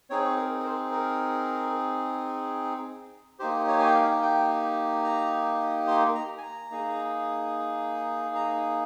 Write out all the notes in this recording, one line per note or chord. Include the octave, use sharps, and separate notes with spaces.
C4 D#4 G#4 C#5
A#4
A#4
C5
A#4
A#3 D#4 G4 C5
C#5
G#5
G5
F5
G5
A#5
C6
A#5
G#5
A#5
A#3 D#4 G#4
A#5